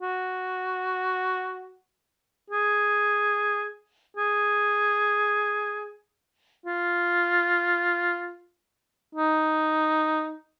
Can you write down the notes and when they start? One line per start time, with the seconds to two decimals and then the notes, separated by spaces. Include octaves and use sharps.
0.02 F#4
2.50 G#4
4.17 G#4
6.66 F4
9.15 D#4